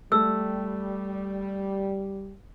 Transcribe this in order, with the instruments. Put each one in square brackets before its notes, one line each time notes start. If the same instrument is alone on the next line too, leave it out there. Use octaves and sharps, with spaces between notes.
[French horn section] G3 [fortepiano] A3 [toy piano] E6